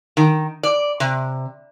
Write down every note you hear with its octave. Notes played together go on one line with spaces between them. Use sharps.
D#3
D5
C3